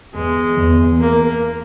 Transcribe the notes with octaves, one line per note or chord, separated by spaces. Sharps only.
E2 G#3
E2
A#3